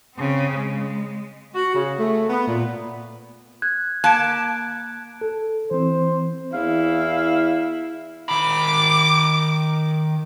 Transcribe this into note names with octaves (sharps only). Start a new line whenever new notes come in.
C#3 C4
G#3
F#4
C#3
A3
B3
A#2
F#6 G#6
A#3 A5 F#6 D7
A4
E3 C4 C5
E2 E4 F5
D#3 B5 D6